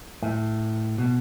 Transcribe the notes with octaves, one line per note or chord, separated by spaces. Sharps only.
A2
B2